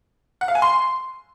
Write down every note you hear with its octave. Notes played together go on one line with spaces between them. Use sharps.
F#5
F5
G#5
C6